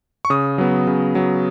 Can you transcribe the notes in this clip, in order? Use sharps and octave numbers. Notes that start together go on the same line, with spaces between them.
C#6
C#3 D#6
F#3 B3
C#3
F#3 B3